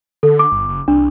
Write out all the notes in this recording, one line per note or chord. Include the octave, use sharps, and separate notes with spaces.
D3 A4
D6
G1
F#1
C2 D4